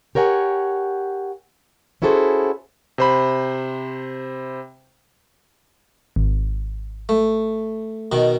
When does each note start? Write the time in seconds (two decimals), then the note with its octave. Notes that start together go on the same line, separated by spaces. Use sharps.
0.15 G4 A#4 C#5 F#5 G#5
2.02 C#4 E4 F#4 G#4 A4 C5
2.98 C3 C5 B5
6.16 G#1
7.09 A3
8.12 B2 D#3